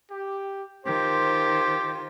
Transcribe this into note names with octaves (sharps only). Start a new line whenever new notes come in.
G4
D#3 F4 G4 C5